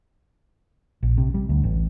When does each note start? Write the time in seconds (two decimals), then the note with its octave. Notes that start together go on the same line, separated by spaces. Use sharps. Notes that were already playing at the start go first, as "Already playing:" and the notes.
1.03 A#1
1.18 C3
1.34 G3
1.49 D2
1.64 A1